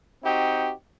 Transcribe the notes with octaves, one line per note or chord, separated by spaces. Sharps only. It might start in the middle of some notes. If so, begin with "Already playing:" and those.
C4 D#4 F#4 G4